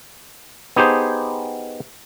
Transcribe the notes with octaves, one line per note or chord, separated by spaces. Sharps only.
B3 D#4 G4 G#4 C5